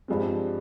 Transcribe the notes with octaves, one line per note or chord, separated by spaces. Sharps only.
G2 F3 G#3 C4